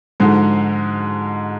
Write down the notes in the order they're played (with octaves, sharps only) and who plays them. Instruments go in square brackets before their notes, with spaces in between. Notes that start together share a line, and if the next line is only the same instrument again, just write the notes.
[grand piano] G#2 [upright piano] D3 F3 G#3 D#4 F#4